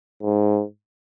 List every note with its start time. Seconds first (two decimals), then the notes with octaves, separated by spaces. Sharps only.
0.22 G#2